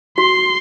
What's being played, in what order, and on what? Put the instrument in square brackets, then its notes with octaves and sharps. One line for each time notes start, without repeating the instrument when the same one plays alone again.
[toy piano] F#4 [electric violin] C6